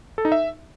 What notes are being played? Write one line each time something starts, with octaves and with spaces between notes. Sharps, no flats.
A4
D#4
E5